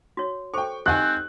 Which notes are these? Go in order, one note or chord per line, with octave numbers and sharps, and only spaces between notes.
F#4 C#5
A4 C5 G5 C#6
C4 D#4 G4 F#5 G#5 F#6